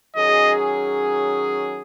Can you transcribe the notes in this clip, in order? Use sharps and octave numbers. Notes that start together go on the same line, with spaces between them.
D#3 F#3 C#4 G#4 D#5